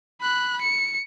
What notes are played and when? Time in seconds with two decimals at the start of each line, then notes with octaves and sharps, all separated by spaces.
0.21 B5 F#6
0.61 C#7